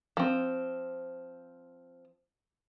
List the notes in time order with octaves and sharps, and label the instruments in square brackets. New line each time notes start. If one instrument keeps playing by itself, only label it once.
[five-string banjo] F3 C4